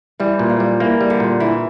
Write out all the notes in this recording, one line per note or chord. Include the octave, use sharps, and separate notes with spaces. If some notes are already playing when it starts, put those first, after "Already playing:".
E3 G3
A#2
F3
G3
E3 A#3
G3
D3
A#2
E3 E4